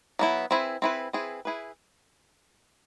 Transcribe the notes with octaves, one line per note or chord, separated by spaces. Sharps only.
F#3 B3 E4
C4 E4 G#4 B4
C4 E4 G#4 B4
C4 E4 G#4 B4
E4 G#4 B4